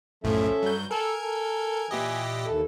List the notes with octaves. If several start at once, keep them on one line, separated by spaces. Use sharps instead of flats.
B1 F#2 A2 F3 C#4 A4 E5
G2 F#3 G6
A4 A#4 G#5
A4
A#2 E3 G4 D#5
D#2 A4